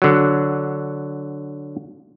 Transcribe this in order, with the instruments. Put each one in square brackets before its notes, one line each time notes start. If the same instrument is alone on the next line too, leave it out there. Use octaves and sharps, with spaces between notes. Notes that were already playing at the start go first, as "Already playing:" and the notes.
[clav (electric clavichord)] D3 F#3